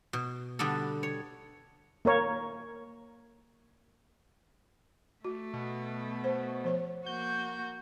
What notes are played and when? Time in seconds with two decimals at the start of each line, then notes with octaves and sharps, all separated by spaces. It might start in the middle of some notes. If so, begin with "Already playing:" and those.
0.13 B2
0.59 D3 G3 B3 D4 A4
1.03 C#5
2.05 A#3 A#4 C#5
5.25 A3 F#4
5.53 B2
6.24 C5
6.64 F3 C5 C#5
7.06 A#3 F#4 G6